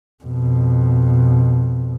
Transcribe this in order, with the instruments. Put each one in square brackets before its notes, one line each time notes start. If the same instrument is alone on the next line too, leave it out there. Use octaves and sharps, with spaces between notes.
[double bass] F2 B2